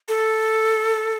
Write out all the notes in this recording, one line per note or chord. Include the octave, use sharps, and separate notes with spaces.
A4